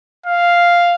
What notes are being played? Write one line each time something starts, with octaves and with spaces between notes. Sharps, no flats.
F5